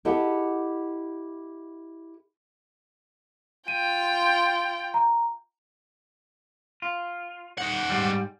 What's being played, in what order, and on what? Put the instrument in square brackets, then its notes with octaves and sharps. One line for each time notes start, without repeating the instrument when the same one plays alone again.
[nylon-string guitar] E4 G4 A4 D#5 F#5
[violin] F4 G5 [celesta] D#7
[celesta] A#5
[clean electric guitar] F4
[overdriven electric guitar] D#4 F#5
[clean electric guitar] G#2 G3